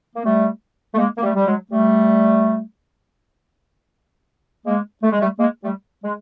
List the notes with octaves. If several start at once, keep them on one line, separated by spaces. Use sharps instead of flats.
A#3
G3 A3
A3
G#3 A#3
A#3
G3 A3
G3
F#3 G#3
G3 A3
G#3 A#3
A3
G#3
G3 A3
G#3 A#3
G3 A3
G#3